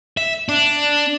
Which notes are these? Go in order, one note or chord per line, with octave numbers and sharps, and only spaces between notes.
E5
D4